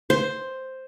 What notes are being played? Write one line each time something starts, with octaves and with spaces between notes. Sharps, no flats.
C5